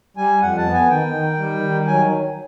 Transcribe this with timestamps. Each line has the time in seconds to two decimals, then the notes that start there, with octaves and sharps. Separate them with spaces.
0.17 G3 G#5
0.41 F2 F#5
0.57 A5
0.66 B3
0.73 G#5
0.89 D#3 G5
1.14 D#3
1.38 G3
1.63 D#3
1.87 F#3 G#5